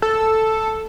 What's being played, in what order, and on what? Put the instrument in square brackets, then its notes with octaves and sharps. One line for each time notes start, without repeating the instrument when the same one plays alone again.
[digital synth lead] A4